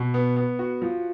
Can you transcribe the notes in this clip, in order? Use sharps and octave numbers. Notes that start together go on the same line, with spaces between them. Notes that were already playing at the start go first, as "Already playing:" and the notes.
Already playing: B2
B3
B3
F#4
F3